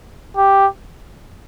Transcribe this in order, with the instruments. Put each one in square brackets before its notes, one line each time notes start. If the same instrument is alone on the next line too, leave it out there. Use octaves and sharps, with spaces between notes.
[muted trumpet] G4